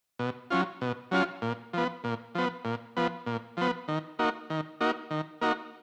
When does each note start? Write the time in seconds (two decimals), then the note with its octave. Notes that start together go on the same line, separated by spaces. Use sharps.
0.19 B2
0.51 F#3 C#4 F4
0.81 B2
1.11 F#3 C#4 F4
1.42 A#2
1.73 F3 B3
2.04 A#2
2.35 F3 B3
2.65 A#2
2.97 F3 B3
3.26 A#2
3.57 F3 B3
3.88 D#3
4.19 A#3 D#4 F#4
4.50 D#3
4.81 A#3 D#4 F#4
5.11 D#3
5.41 A#3 D#4 F#4